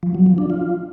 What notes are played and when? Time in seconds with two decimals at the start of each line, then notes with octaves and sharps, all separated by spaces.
0.03 F3
0.15 F#3
0.26 F3
0.38 D4
0.50 F4